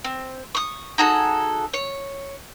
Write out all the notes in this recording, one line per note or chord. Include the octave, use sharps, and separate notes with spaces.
C4
C#6 D#6
D#4 F#4 G#4 A4
C#5